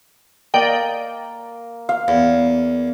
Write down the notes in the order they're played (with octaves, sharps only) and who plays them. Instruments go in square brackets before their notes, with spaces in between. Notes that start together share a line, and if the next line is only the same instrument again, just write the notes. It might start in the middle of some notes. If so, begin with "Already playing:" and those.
[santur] A#3 [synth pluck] D5 D#5 G5
[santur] F5
[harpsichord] E2